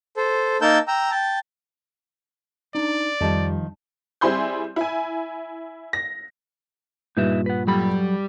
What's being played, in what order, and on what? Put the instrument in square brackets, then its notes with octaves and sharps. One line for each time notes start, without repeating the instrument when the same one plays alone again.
[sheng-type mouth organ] A4 C5
A#3 D#4 A#4 A5 E6 G6
G5 A#5 E6
G5 A5
[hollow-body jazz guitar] D4 D#4 [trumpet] D5
[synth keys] F2 G3 [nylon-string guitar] D#3 F3 [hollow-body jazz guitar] D#5 A5
[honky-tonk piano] G3 C4 E4 G#4 C6 G6
E4 G#5
A#6
[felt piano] G2 A#2 [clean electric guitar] D#4 B4 E5
[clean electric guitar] B4 F#5
[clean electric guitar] F#3 A4 B5 [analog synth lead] G3